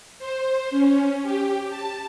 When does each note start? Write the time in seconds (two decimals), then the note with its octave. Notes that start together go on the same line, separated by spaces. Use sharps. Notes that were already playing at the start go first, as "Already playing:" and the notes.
0.19 C5
0.71 C#4
1.23 G4
1.70 A5